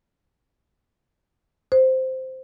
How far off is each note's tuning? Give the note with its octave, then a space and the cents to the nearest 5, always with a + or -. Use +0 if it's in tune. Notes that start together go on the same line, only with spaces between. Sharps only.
C5 -5